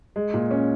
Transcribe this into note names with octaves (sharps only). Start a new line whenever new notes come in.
G#3
A#2
C#4